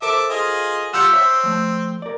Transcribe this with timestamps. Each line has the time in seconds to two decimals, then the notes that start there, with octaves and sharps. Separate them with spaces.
0.02 A4 A#4 C5 E5 A5 D6
0.30 F4 G#4 D#5
0.93 G3 F4 F#5 E6 G6 C#7
1.13 C4 C#5 E5
1.43 F3 A3
2.02 A#4 D5